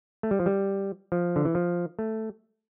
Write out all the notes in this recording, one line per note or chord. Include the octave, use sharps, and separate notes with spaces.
A3
G3
F3
G3
F3
D3
E3
F3
A3